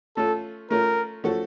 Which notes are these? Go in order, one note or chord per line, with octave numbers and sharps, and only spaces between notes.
A3 C#4 F4 A4
A3 C#4 F4 A#4
F3 A3 C#4 F#4 A4